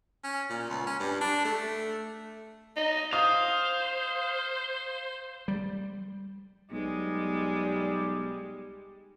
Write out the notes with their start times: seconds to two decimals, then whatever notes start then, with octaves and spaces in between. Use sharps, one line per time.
0.24 C#4
0.50 A#2
0.70 C#2
0.87 C#4
1.00 G2
1.21 D4
1.45 A3
2.76 D#4
3.13 C5 F5 D#6
5.48 G3
6.72 B1 G3 G#3